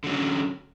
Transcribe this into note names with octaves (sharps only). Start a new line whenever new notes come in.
D3 F#3 C#4